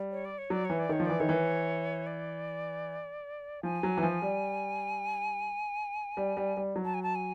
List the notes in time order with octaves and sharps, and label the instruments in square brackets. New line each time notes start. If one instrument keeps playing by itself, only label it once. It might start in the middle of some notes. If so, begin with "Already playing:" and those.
Already playing: [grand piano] G3
[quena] C#5
D5
C#5
[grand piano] F#3 [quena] D5
[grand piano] E3 [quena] C#5
[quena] D5
[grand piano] D#3 [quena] C#5
[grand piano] F3
[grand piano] E3 [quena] D5
[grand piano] D#3 [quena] C#5
[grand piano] E3
[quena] D5
[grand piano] F3 [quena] G#5
[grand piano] F#3
E3
F3
G3
G3
G3
G3
F#3
[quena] A5
G#5
A5
G#5